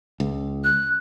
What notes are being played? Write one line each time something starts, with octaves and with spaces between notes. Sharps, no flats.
C#2
F#6